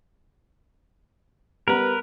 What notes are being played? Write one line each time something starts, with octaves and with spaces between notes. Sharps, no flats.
G3 B3 A#4 B4 A#5